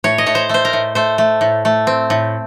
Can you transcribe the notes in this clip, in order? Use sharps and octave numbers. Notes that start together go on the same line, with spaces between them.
A2 C#5
D#5
A2 C#5
C5
A3 C5
A#4
A2
A3 C5
A3
A2
A3
C4
A2